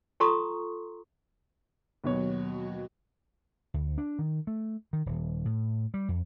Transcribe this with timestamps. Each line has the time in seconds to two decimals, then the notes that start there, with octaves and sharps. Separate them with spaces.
0.20 F4 A4 A#5 C6 C#6 D#6
2.04 D#2 B2 F#3 F#4 C#5
3.74 D2
3.98 D4
4.19 D#3
4.47 A3
4.93 D#3
5.06 D#1
5.45 A2
5.94 G3
6.09 F2